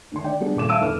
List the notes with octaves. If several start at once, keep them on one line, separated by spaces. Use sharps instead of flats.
D2 D#3 C6
D5 G5
G3 B3 D4 G4 G#4
D#1 A#2 A4 D6 E7
E5 F5 A5 E6 D7 D#7
G1 E2 A4 B4 F6